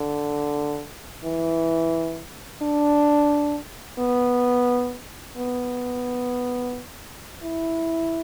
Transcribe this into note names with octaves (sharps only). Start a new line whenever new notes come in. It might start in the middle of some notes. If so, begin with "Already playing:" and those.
Already playing: D3
E3
D4
B3
B3
E4